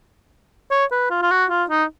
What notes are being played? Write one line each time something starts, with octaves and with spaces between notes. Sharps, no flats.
C#5
B4
F4
F4
F#4
F4
D#4